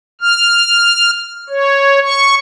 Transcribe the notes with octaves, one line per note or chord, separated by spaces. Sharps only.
F6
C#5
C#6